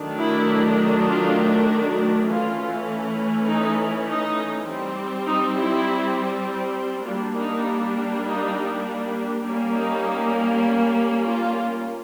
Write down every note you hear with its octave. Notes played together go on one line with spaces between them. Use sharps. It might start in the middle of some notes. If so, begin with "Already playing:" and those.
Already playing: D#3 F#3 A3 D4
E4
F4
F#4
E3 A3 C#4 F4
D#4
D#4
G3 C4
D#4
E4
G3 A#3 D4 F4
D#4
D#4
G3 A#3 C#4 D4
D#4
F4